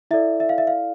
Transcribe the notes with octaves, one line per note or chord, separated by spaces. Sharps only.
E4 A4 D5 E5
E5
F5
E5
F5